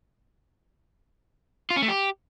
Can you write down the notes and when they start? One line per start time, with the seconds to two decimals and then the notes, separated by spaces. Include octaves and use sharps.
1.70 F4
1.76 C#4
1.82 A3
1.88 G4